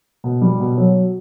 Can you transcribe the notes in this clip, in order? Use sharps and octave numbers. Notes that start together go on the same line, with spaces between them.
B2
G3
B2
F#3